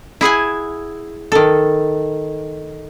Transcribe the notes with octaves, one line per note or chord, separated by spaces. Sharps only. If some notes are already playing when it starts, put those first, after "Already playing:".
E4 G#4 F#5 G#5
D#3 A4